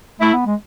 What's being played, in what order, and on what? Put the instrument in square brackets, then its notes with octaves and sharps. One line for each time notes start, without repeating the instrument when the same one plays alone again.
[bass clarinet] A3 [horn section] E4
[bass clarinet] B3
G#3